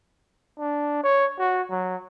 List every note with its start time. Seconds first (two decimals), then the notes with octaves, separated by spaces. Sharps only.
0.59 D4
1.03 C#5
1.38 F#4
1.70 F#3